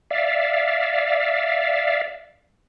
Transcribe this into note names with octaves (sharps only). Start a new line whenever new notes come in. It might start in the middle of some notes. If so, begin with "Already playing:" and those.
D5 E5 F5